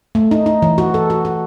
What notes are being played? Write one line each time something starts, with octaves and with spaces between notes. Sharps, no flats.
A3
D#4
D#4
E3
F#4
A4
F#4
F#4